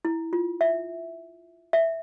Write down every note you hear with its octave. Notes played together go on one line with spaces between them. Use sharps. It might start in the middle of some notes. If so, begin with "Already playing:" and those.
E4
F4
E5
E5